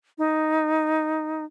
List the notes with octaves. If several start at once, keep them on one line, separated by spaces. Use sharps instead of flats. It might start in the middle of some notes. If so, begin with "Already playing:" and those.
D#4